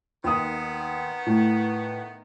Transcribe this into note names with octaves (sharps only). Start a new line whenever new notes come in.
D#2 D#3 B3 D#6
A2